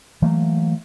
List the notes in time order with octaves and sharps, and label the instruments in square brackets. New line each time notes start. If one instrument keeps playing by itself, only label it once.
[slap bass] E3 F#3 A3 A#3